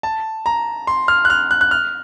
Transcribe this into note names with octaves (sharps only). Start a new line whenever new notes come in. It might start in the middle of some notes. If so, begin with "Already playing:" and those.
A5
A#5
C6
F6
F#6
F6
F#6
F#6
F6